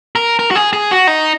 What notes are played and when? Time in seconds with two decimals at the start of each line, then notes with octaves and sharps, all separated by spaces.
0.16 A#4
0.39 A#4
0.51 F#4
0.56 G#4
0.73 G#4
0.91 F#4
1.07 D#4